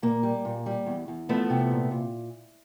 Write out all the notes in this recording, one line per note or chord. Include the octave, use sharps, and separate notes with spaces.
A#2 A#3
G3
A#2
G3
E2
E2
F3 A3 B3
C3
A#2
A#2